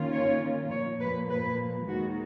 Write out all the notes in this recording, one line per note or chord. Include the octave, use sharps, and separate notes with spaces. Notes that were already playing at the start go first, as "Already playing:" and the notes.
Already playing: D#3 A#3 C#4 F4
C#5
A#2 F3 A#3 C#5
B4
B4
D#2 D#3 G#3 D#4 F#4